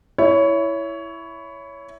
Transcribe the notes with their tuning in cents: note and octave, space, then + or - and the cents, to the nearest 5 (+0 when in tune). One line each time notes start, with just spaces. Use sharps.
E4 +5 C#5 +15